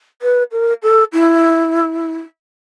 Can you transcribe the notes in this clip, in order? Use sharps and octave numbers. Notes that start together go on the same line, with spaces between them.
B4
A#4
A4
E4